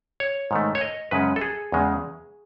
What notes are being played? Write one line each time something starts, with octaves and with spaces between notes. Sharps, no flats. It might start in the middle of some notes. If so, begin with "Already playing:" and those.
C#5
G#2 D#3 A3
C#5
D#5
F#2 C#3 G#3 C#4 B4
A4
G#4
E2 C#3 G#3